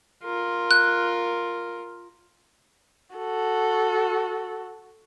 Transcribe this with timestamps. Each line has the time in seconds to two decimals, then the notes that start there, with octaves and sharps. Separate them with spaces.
0.24 F4 A#4
0.71 F#6
3.16 F#4 A4